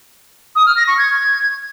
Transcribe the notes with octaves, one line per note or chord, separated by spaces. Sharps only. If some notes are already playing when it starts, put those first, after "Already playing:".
D#6
F6
A#6
C#6
G#6